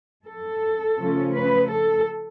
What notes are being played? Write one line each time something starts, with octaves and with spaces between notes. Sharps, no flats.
A4
C#3 F3 A3 C#4
B4
A4